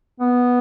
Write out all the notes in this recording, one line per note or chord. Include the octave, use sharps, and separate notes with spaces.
B3